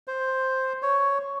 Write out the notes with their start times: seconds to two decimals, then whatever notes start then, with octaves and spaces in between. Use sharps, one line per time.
0.08 C5
0.82 C#5